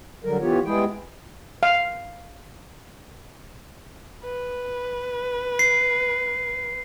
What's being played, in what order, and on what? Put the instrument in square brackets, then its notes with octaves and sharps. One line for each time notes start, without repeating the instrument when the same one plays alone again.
[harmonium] D3 F#3 G3 A#4
E3 B3 F4 G4 C#5
G3 G#3 B3 E4 G#4 G5
[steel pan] F5
[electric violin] B4
[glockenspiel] C7